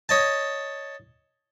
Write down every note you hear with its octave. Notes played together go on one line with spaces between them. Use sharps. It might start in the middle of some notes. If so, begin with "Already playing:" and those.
C#5 D#5 A5